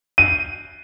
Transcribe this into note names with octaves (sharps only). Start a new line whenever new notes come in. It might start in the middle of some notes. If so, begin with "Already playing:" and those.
D#7